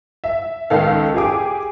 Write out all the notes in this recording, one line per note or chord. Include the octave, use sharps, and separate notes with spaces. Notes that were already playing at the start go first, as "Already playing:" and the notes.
E5
C#2 D#3 A4 F5
G4 G#4 D6